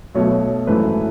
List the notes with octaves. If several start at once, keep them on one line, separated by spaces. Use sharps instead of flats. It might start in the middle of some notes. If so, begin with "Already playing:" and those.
B1 B2 A3 C#5
G#1 F#2 E3 A3 B4